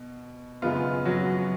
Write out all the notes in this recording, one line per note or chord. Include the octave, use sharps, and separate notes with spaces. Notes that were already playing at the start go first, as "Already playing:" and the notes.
Already playing: B2
F#2 C#3 G#3 B3 F4
F#3 F#4